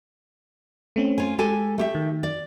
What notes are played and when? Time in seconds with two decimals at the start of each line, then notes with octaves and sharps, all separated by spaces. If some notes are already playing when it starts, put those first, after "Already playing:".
0.96 A3 C4 C#4
1.18 F4 C#5 G#5
1.38 G#3 G4 A4 G#5
1.78 A3 G4 E5
1.95 D#3
2.23 D5